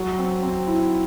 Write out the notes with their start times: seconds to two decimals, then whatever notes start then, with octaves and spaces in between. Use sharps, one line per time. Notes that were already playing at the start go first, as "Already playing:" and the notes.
Already playing: F#3
0.18 C4
0.43 C4
0.68 E4